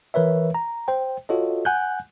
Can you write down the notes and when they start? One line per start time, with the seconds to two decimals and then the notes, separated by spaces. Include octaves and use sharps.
0.14 E3 A#4 B4 C#5 E5
0.55 A#5
0.88 C5 G5
1.29 F4 F#4 A4 C#5 D#5
1.65 F#5 G#5 F#6 G6